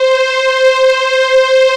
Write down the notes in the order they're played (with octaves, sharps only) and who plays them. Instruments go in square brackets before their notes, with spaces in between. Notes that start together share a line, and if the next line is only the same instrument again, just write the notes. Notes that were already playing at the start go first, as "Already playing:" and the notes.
Already playing: [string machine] C5